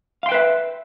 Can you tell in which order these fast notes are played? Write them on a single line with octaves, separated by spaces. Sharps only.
F5 C6 G5 B4 E5